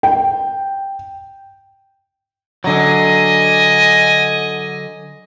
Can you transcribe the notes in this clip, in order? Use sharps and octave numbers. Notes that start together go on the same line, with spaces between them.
G5
D3 F#3 D#5 G#5